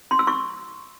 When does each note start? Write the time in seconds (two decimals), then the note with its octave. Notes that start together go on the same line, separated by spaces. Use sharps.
0.11 C6
0.19 E6
0.27 C#6